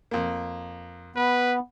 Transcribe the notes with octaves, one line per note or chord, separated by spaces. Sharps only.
F2 A#3
B3 B4